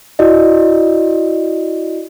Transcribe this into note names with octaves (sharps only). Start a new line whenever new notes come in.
E4 F#4 D5 D#5